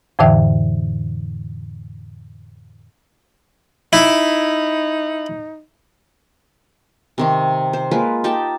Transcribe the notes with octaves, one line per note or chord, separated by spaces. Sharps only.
F2 A2 D3 E3 E5 G5
D#4 E4
C3 D#3 C4
C5
G#3 A#3 F4 B4
D#4 G4 G5 A5